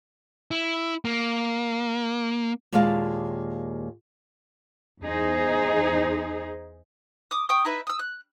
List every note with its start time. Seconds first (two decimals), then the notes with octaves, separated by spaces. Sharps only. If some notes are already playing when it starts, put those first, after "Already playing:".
0.51 E4
1.05 A#3
2.72 D#2 A#2 G#3 E4 F5 A5
5.03 E2 D#4 G#4 C5
7.31 D6 D#6
7.49 G5 C#6 D#6
7.65 D#4 E4 B4 E5
7.87 D#6 E6
7.99 F#6